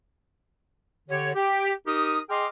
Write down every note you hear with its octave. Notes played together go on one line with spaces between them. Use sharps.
D3 G4 C#5
G4
D#4 G4 A#4 D#6
G#4 D#5 G5 C6 D6 F6